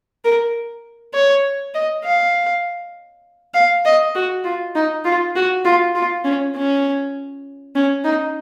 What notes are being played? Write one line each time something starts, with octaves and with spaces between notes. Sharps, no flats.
A#4
C#5
D#5
F5
F5
D#5
F#4
F4
D#4
F4
F#4
F4
F4
C#4
C#4
C#4
D#4